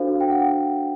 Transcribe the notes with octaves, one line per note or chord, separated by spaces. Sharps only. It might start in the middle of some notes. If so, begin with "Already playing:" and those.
Already playing: D4 F#4 A4 C5 F5
G5
F#5